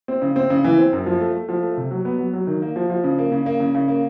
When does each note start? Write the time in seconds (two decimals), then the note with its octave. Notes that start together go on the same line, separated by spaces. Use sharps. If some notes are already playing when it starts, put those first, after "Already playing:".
0.08 C4
0.22 C#3
0.36 C4
0.50 C#3
0.64 E3
0.78 C4
0.93 F#2
1.06 F3
1.21 A3
1.35 A3
1.49 F3
1.62 A3
1.77 C3
1.91 F#3
2.05 B3
2.19 F#3
2.33 F#3
2.47 D#3
2.62 A#3
2.76 F3
2.90 F3
3.04 C#3
3.19 A#3
3.32 C#3
3.46 A#3
3.60 C#3
3.75 C#3
3.88 A#3